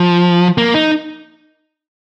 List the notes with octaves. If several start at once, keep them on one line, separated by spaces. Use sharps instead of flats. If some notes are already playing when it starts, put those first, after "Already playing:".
Already playing: F3
A#3
D#4